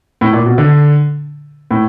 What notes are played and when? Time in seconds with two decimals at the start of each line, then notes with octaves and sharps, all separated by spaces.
0.21 A2
0.33 A#2
0.46 B2
0.58 D3
1.71 A2